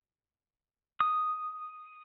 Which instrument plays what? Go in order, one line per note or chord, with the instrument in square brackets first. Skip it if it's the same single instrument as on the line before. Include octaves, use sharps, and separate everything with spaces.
[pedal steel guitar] D#6